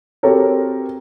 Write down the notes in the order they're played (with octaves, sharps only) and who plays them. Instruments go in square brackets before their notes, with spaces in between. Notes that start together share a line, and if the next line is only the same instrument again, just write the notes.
[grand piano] C4 F#4 G4 A4 A#4 C#5